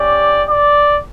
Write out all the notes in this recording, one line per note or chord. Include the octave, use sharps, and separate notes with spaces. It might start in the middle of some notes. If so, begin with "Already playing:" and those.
Already playing: C#4 G4 D5
D5